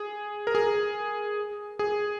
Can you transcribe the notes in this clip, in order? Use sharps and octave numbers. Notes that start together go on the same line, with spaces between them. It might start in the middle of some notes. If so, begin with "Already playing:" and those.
Already playing: G#4
A#4
G#4
G#4